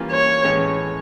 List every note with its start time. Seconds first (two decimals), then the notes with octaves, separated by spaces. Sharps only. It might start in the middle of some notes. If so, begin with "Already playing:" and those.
Already playing: E3 G3 A#3 C#4 F4
0.12 C#5
0.44 A2 E3 G#3 C#4